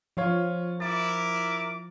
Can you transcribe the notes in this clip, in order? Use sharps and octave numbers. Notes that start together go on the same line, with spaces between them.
F3 C#4 F4 C#5
E4 A#4 D6 A6